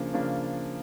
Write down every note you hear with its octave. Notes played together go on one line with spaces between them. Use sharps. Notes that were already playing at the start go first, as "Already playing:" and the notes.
Already playing: C#3 F3 A#3 D4
C#3 F3 A#3 D4